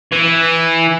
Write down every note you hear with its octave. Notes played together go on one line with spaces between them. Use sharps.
E3